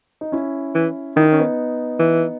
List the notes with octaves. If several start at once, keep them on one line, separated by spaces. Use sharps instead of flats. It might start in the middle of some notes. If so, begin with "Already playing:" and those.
D#4
C#4 E4
E3
D#3 E4
D#4
C#4
B3 D#4
E3